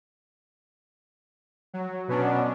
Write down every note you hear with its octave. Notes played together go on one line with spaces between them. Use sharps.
F#3
B2 F#3 B3 C#4 D4